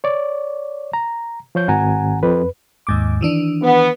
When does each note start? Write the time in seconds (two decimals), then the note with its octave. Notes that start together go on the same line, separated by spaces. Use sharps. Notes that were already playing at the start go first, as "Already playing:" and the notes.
0.04 C#5 D5
0.93 A#5
1.55 F3 C#5 G6
1.68 G#1 F#5 G#5 A#5
2.23 F2 B4
2.87 D#2 G#2 D6
3.21 D#3 E3 D4
3.62 B3